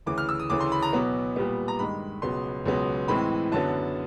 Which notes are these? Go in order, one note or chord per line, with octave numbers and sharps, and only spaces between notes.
D2 C#3 E3 D6
F6
E6
D#6
D2 C#3 E3 A3 D6
C6
B5
A#5
B2 F#3 B3
A#2 G3 B3
A#5
G2 D#3 G#3 B5
C#2 B2 F#3 B3 C6
C#2 B2 F#3 B3
A2 E3 G#3 C4 B5
F#2 D3 F#3 B3 A5